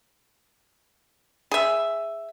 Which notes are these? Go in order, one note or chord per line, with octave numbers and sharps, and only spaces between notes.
G#4 E5